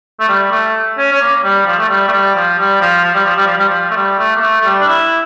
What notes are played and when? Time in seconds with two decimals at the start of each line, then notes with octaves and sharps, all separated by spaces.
0.20 A3
0.28 G3
0.51 A3
0.98 C#4
1.12 C#4
1.21 A#3
1.44 G3
1.66 F3
1.79 A3
1.89 G3
2.08 A3
2.12 G3
2.36 F3
2.58 G3
2.81 F3
3.04 F3
3.14 G3
3.26 F3
3.36 G3
3.46 F3
3.57 G3
3.68 F3
3.91 A3
3.96 G3
4.19 A3
4.36 A#3
4.41 A3
4.61 A3
4.65 G3
4.80 D4
4.87 E4